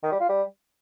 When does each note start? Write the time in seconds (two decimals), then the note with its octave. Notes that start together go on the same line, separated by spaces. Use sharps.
0.03 D#3
0.12 G3
0.21 F4
0.29 G3